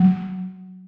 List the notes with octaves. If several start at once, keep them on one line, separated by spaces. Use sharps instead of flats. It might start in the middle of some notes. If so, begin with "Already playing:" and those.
Already playing: F#3